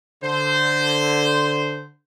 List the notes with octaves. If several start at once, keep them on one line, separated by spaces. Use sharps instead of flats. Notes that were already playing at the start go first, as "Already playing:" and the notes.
D3 C5